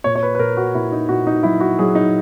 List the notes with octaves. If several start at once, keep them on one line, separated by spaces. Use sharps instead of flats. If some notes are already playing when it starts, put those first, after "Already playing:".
A#2 C#5
C#5
B4
B4
A#2 A#4
F#4
A#2 E4
D#4
A#2 F#4
D#4
F#3 E4
F#4
F#3 G#4
D#4